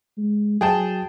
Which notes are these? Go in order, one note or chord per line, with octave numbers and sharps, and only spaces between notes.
G#3
F#3 G#4 G5 A5